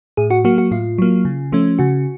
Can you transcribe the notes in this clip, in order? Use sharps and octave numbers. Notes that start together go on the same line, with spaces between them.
A2 G#4
F#4
F#3 A#3 F#4
F#4
A2 F4
F#3 A#3
C#3
F3 A3 C#4
C#3 F#4